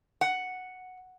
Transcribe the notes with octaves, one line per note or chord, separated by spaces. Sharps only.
F#5